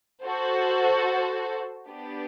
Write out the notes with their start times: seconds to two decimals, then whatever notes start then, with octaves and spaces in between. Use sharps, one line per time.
0.22 F#4 A4 C5
1.87 B3 D4 G4